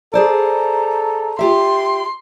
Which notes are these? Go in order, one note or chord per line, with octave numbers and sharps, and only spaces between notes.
G#4 A4 C5 D5 A#5
F4 G4 E5 C6